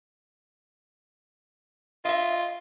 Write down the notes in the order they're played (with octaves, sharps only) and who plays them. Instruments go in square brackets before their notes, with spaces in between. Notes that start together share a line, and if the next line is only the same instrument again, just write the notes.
[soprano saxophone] F4 [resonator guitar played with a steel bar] D#5 E5